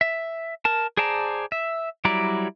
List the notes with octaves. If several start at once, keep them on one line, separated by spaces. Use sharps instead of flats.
E5
A#4 A5
G#4 C5 D5 A5 A#5
E5
F#3 G3 E4 D5 A#5